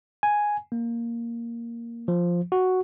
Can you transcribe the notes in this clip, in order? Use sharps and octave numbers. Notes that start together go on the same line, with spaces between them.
G#5
A#3
F3
F#4